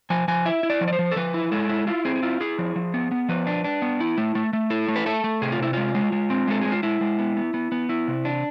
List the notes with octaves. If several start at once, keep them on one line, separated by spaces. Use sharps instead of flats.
F3 G#5
F3 G#5
E4 E5
E4
D5
F3
D5
C5
F3
A4
F3 B4
E4
G#3 A4
E4
E4 F4
C4 G#4
G#4
E4 F4
E4 G#4
F3
F3
B3
B3
F3 B4
D4
D4
B3
E4
A3
A3
A3
E4 A4
A3
B4
A3 A4
A3
C3 G#4
F4
C3 E4
G#3 F4
G#3
G#3
C4
G#3 A4
G#3 G#4
F4
G#3 E4
G#3
B3
B3
B3
B3
E4
C3
D4